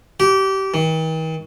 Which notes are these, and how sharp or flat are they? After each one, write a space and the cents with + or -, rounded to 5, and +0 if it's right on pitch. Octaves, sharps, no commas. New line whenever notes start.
G4 -25
D#3 +45